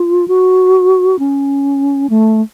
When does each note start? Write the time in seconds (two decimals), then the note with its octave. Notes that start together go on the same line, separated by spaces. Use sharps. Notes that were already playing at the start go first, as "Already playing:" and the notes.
Already playing: F4
0.28 F#4
1.19 C#4
2.10 A3